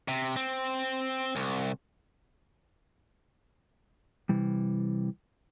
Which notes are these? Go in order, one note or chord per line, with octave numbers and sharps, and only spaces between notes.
C3
C4
C2
C3 E3 G3